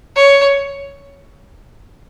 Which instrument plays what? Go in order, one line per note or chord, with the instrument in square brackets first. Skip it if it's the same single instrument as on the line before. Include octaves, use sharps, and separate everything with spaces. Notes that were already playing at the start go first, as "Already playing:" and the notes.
[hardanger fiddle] C#5